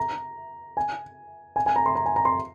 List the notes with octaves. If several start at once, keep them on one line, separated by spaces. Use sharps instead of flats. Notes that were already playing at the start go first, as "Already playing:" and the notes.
Already playing: A#5
G#5
G#5
G#5
A#5
C6
A#5
G#5
A#5
C6